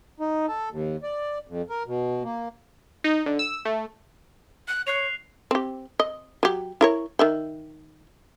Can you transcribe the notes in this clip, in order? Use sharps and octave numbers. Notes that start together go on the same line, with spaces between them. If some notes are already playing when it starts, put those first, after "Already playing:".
D#4
A4
D#2
D5
F2
A#4
B2
A#3
D#4
D3
E6
A3
F#6
C#5 F#6 C7 F7
C4 G4
D#5
F#3 G4
E4 A#4 C#5
D#3 E5 G5